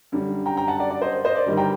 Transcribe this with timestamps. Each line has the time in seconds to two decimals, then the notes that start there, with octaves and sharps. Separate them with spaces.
0.12 F#2 D3 G3
0.46 G5 A#5
0.57 G5 A#5
0.68 F#5 A5
0.80 D5 F#5
0.90 D5
1.02 C5 D#5
1.25 C5 D#5
1.36 D5
1.46 G1 G2 D#3 G3
1.57 G5 A#5